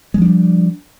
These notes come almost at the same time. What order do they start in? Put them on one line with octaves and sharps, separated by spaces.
G#3 F3 D4 G3